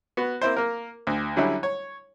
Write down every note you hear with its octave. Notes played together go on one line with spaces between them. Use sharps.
B3 F#4
A#3 C4 E4 C5
A#3 A#4
D2
D3 F#3 G3 C#4 E4
C#5